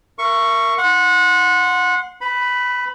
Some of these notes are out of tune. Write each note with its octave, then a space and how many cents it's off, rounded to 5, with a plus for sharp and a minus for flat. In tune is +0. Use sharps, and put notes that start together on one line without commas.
A#4 +0 E5 +40 C#6 +0
F#5 -25 C6 +0
B4 +35 B5 +0